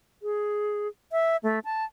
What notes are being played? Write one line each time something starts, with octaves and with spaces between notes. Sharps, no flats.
G#4
E5
A3
A5